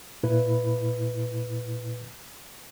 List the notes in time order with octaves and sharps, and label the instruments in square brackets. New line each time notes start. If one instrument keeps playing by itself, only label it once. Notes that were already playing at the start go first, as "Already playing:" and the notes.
[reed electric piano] A#2 E4 B4